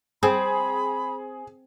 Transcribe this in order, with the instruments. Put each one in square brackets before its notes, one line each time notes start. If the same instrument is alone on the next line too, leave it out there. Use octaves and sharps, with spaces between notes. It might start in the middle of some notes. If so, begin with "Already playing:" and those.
[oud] C4 [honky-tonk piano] G#4 [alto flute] B5